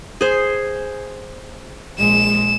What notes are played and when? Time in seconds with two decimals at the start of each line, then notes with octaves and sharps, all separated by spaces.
0.21 G#4 C5
1.98 A#1 G#3 E7